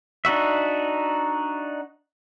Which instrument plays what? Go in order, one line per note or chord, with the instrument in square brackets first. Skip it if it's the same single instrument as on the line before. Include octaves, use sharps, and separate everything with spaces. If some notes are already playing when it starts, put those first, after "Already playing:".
[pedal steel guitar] D4 D#4 F#4 E5